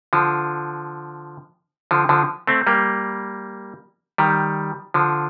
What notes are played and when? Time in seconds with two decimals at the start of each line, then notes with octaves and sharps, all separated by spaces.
0.13 D3 F3
1.91 D3 F3
2.09 D3 F3
2.47 A3 C4
2.67 G3 A#3
4.18 D#3 G3
4.94 D3 F3